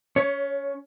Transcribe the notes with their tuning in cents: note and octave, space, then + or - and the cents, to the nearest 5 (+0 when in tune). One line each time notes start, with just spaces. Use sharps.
C#4 +25 C#5 +0